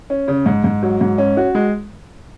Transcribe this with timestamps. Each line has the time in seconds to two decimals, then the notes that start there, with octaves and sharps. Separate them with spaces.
0.10 C#4
0.28 C#3
0.46 G#2
0.64 G#2
0.83 F#3
1.01 G#2
1.18 C#4
1.37 F#4
1.55 G#3